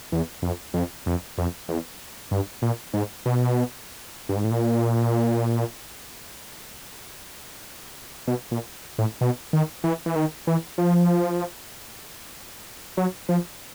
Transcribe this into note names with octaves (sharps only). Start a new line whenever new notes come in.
E2
F2
F2
F2
F2
E2
G2
A#2
G#2
B2
G2
G#2
A2
A#2
B2
A#2
A2
B2
D#3
E3
E3
D#3
E3
F3
F#3
F3